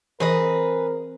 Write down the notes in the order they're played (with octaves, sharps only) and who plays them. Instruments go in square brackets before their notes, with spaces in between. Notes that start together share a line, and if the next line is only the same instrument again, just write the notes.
[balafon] E3 [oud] C4 [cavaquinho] G#4 B4 D#5 [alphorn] A#4